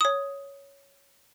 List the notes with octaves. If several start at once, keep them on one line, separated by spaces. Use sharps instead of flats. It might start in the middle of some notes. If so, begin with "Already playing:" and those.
C#5 D#6